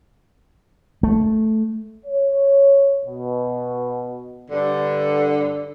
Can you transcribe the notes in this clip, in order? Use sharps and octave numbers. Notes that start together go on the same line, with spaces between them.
A3
C#5
B2
G2 D3